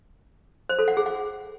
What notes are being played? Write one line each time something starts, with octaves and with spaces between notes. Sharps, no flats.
C5
A4
F#5
G#4
F#5